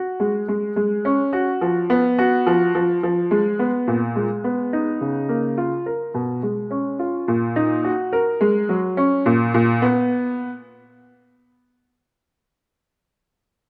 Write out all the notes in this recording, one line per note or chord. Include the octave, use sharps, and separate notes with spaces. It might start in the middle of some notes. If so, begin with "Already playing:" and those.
Already playing: F#4
G#3
G#3
G#3
C#4
F#4
F3
B3
F#4
F3
F3
F3
G#3
B3
A#2
G#3
B3
D#4
C#3
A#3
F4
A#4
B2
G#3
C#4
F4
A#2
D#4
F#4
A#4
G#3
F#3
C#4
A#2
A#2
B3